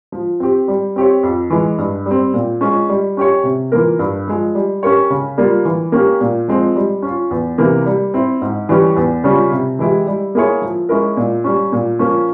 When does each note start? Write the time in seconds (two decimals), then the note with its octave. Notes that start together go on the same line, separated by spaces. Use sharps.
0.12 F3
0.40 C4 G4
0.68 G3
0.96 C4 G4 C#5
1.23 F2
1.50 E3 G#3
1.78 G2
2.06 G3
2.11 C4
2.34 A#2
2.61 G#3 C#4 F4
2.89 G3
3.17 C#4 G4 C#5
3.44 C3
3.72 E3 A#3 F4 A#4
3.99 G2
4.27 F3 G#3
4.55 G3
4.83 C#4 G4 A#4 C#5
5.10 C#3
5.38 G3 A#3 F4
5.65 E3
5.92 A#3 C#4 G4
6.21 A#2
6.48 F3 G#3 C4
6.76 G3
7.02 C#4 F4
7.31 E2
7.58 C3 E3 A#3
7.86 G3
8.14 C4 E4
8.42 G#2
8.69 E3 G3 C#4 G4
8.96 E2
9.24 C#3 G3 C#4 F4
9.51 C3
9.79 E3 G#3 E4 G4
10.07 G3
10.35 A#3 E4 G#4 C#5
10.62 F3
10.89 G#3 C#4 E4 A#4
11.17 A#2
11.44 G3 C#4
11.72 A#2
11.99 F3 A#3 C#4